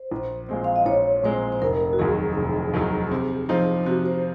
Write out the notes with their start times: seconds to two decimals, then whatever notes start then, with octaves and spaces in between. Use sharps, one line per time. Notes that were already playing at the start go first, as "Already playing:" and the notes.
Already playing: C5
0.11 A#1
0.49 A#2 G#3 C4
0.64 F5
0.76 D#5
0.86 A#1 C#5
1.23 A#2 G#3 C4 C5
1.52 C5
1.62 F1 A#4
1.93 F#4
1.99 D#2 D#3 F#3 G#4
2.37 F1
2.74 D#2 D#3 F#3
3.12 C3
3.49 F3 C4 D#4
3.86 C3 F#4
4.06 C5